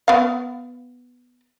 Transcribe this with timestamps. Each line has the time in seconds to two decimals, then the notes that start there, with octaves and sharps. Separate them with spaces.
0.08 B3 F5